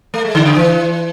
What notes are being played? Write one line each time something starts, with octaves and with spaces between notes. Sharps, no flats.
A3
G#3
D3
C#3
E3